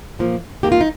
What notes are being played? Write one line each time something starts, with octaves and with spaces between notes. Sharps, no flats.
A#2 F3 A#3
D#2 D#3 A#3 G4
F4
D#4